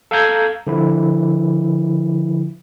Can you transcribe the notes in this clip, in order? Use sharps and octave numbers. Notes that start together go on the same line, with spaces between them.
A4 F5 A#5 G6 G#6
D3 F3 E4